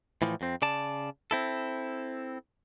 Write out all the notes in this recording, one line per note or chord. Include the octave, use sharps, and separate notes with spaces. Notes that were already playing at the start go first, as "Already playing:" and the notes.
A2 E3 F3
F2 C4
C#3 D5 A5
C4 E4 A4